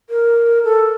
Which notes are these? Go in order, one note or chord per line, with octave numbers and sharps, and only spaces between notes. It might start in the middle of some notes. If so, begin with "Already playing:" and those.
A#4
A4